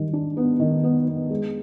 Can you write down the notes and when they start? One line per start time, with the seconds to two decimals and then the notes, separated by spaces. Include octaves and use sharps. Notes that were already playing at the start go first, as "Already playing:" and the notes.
Already playing: D#3 G3
0.13 D4
0.37 B3
0.59 D#3
0.84 B3
1.08 B3
1.30 G#3